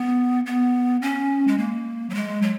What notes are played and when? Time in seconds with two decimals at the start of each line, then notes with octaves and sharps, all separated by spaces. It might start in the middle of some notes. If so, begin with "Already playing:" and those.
Already playing: B3
0.46 B3
1.02 C#4
1.48 G#3
1.58 A#3
2.10 F#3
2.15 G#3
2.42 F#3